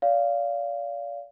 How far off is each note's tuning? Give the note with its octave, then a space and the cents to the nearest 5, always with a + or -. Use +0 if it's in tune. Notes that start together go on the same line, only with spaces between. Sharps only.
D5 -40 F5 -5